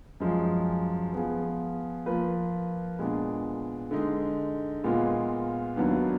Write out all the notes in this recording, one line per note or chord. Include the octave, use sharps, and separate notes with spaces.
F#2 F3 G#3
F3 B3 F4 G#4
F3 A#3 F4 B4
A#2 G#3 B3 D4
D3 G#3 D#4
A#2 G#3 B3 F4
D#2 D#3 F#3 B3 D4